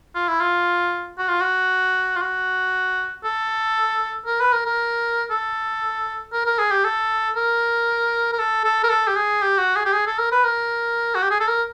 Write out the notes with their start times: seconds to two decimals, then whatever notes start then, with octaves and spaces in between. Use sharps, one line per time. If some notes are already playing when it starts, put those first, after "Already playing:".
0.15 F4
0.28 E4
0.40 F4
1.18 F#4
1.29 F4
1.41 F#4
2.16 F4
2.21 F#4
3.24 A4
4.26 A#4
4.40 B4
4.53 A#4
4.66 A#4
5.30 A4
6.33 A#4
6.46 A#4
6.58 G#4
6.71 G4
6.85 A4
7.36 A#4
8.33 A#4
8.39 A4
8.64 A4
8.84 A#4
8.90 A4
9.07 G4
9.16 G#4
9.42 G4
9.58 F#4
9.76 G#4
9.85 G4
9.93 G#4
10.07 A4
10.18 A#4
10.32 B4
10.44 A#4
11.15 F#4
11.22 G4
11.31 G#4
11.40 A4
11.48 A#4